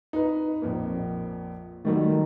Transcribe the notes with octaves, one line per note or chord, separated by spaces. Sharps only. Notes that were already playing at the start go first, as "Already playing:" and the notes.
D#4 B4
A#1 F2 A#3
D#3 F#3 G3 A3